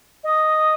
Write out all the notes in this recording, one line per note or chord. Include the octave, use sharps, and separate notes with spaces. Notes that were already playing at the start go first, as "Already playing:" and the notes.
D#5